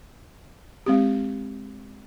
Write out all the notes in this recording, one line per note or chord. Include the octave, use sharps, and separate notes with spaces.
G#3 C4 G4